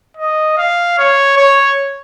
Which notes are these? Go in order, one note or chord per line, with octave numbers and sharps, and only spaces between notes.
D#5
F5
C#5
C#5